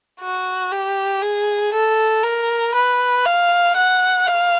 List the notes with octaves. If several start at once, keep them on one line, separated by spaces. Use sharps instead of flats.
F#4
G4
G#4
A4
A#4
B4
F5
F#5
F5